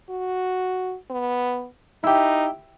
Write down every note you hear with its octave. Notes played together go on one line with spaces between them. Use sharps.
F#4
B3
D#4 E4 G4